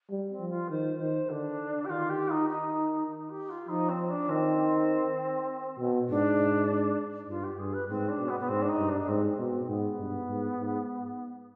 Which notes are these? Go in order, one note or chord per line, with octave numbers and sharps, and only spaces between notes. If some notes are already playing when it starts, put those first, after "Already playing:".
G3
C4
F3
F4
D#3 C5
D#3 C5
D3 D4
G4
D#3 F4
G4
D#4
D#4
D#4
G4
F4
F3 D#4
C4
D4
D#3 C4
B2
G#2 D4
G2 F4
G4
G2 G#4
B4
G#2 C4
D4
B2
B3
B3
G#2 C4
D4
D#4
G2
D4
D4
G#2 C4
C4
B2
C4
G#2 B3
G2
G#2
G#2